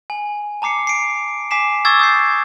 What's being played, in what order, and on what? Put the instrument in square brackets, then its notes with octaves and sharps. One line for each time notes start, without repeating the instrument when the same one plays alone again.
[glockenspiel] G#5
A5 A#5 D6 C7 C#7
C7 D7
G#5 D6 B6 C7 E7
C#6 D6 E6 G#6 A6
D#6 G6 C7